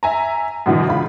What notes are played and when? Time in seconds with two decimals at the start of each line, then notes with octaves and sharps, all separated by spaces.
0.03 E5 G#5 A#5
0.66 F#2 B2 D3 E3
0.88 C#2 F4 B5